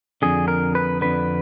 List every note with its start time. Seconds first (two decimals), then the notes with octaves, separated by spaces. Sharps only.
0.22 F2 D3 G#4
0.48 A#4
0.75 B4
1.01 F2 D3 B4